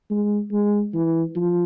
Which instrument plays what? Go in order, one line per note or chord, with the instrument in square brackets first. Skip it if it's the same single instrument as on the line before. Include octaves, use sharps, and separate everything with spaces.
[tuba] G#3
G#3
E3
F3